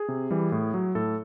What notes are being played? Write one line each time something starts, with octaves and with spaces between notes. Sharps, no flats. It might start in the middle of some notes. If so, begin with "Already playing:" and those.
Already playing: G#4
C3
E3 G3
A2
F#3
A2 A4